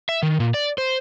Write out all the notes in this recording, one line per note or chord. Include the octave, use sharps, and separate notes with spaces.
E5
D#3
A#2
D5
C5